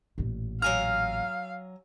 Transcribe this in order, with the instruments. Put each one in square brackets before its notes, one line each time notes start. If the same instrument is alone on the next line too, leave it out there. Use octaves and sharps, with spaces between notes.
[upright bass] A1 A#2
[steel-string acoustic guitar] F#3 G#5 A#5 [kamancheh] F5 [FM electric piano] F6